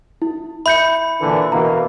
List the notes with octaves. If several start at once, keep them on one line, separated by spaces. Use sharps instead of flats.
E4
E5 B5 G6 C#7
A#2 D3 E3
B2 E3 A#3 A#5